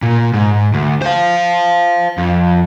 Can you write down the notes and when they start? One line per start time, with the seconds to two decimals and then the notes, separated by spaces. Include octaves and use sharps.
0.02 A#2
0.34 G#2
0.74 D2
1.02 C5 F5
2.18 F2